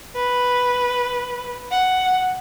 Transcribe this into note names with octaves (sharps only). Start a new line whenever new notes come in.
B4
F#5